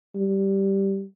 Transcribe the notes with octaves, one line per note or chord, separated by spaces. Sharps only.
G3